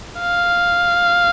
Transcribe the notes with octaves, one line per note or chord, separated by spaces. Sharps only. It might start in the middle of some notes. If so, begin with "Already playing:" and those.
F5